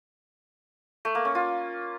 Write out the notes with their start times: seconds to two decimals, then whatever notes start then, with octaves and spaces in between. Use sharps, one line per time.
1.05 A3
1.15 A#3
1.25 C#4
1.35 F4